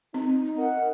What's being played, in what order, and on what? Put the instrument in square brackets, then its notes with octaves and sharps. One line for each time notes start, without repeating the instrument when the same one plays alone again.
[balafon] C4 [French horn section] D#4
[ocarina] A#4 [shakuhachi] F#5